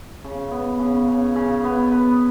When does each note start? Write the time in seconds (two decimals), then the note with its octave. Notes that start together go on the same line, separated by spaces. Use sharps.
0.25 C#3
0.52 B3
0.80 C#3
1.08 C#3
1.36 C#3
1.64 B3
1.92 B4